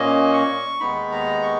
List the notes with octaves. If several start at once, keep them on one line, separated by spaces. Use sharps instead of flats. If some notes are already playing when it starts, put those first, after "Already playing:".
Already playing: A#2 A#3 C#4 D#5
C#6
D#2 D#3 G#3 B3 D#4 B5
A#5
C#6